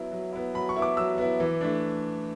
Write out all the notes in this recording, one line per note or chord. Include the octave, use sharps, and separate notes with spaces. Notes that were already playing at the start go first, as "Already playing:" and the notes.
Already playing: F#3 B3 E4
F#3
B3 E4
F#3 B5
C#6
B3 E4
D6
F#3 E6
B3 E4
E3
A3 D4